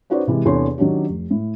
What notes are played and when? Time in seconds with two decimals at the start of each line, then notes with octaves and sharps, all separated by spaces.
0.10 C#4 D#4 F#4 B4 C5 D5
0.27 C3 E3 G#3
0.45 E2 C3 D4 A4 C#5 C6
0.78 D#3 F#3 C#4 D4 G4
1.09 F1
1.31 A2